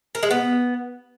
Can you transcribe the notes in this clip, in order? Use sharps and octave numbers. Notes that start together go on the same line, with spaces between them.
A#4
G#3
B3